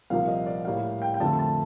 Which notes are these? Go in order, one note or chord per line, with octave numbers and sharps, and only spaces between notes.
C2 A#2 F3 A#3 F5
D#5
D5
A2 G3 A#3 F5
G5
G5
F2 D3 A3 A5
A5